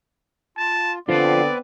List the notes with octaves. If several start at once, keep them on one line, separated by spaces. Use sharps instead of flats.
F4 A5
D3 B3 C4 F4 B4 C5 D5